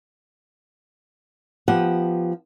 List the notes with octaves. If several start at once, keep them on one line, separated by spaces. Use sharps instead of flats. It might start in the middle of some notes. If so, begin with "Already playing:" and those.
F3 B3 G4 F#5